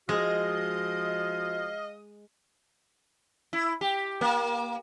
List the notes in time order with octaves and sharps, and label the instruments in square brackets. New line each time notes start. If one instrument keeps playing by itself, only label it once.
[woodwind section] F3 F4 F#4 [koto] G#3 [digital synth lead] D#5 [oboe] F5
[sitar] E4
G4
A#3